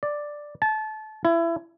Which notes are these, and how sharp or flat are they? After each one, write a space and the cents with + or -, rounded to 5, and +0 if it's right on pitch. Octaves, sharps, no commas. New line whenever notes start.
D5 +5
A5 -25
E4 +25